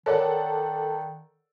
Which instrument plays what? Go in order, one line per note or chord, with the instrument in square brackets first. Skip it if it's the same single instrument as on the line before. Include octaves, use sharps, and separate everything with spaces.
[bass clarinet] D#3 [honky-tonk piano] A4 D5 F#5 [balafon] A#4 C#5